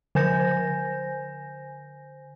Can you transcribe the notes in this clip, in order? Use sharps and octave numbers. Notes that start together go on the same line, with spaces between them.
D3 C5 G#5 G6 A#6